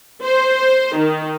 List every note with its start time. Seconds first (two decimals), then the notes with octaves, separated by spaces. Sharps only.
0.23 C5
0.96 D#3